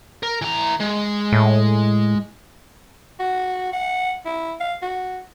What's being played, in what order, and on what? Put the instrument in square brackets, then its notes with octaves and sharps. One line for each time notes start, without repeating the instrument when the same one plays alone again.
[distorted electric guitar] A#4
E3 A#5
G#3
[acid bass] A2
[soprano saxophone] F#4
F#5
E4
F5
F#4